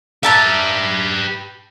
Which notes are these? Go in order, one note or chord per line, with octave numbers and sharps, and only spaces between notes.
G4 B4 E5 A5 A#5